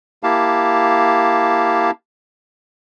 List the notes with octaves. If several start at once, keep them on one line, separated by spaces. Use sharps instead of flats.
A#3 E4 G4 F5 A5